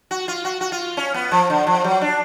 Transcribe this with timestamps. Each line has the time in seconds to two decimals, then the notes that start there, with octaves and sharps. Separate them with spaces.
0.11 F#4
0.28 F4
0.45 F#4
0.61 F#4
0.72 F4
0.97 C#4
1.14 B3
1.32 F3
1.50 D3
1.67 F3
1.84 F#3
2.02 D4